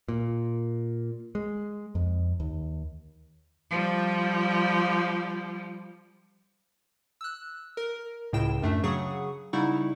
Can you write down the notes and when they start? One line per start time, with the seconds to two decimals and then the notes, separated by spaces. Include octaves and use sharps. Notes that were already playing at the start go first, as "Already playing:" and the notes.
0.09 A#2
1.35 G#3
1.95 F2
2.40 D#2
3.71 F3 G3
7.21 E6 F#6
7.77 A#4
8.33 C#2 A2 C#3 G5 E7
8.62 F#2 A3 D4
8.84 C#3 F#3 G#4 F#5 C#6 D#6
9.53 C#3 G3 D#4 E4 F#5 C#6